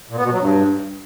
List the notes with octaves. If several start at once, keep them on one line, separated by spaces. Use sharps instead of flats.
A#2
B3
B2
F#3
G2